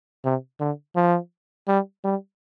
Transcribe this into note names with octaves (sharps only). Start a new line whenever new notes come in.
C3
D3
F3
G3
G3